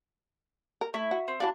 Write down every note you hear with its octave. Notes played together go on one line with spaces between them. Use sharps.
A#4
A3 E4
F#4
C4
E3 D4 F#4 F5 A5